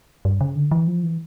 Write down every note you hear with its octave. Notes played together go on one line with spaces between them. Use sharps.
G2
C#3
D3
E3
F3
E3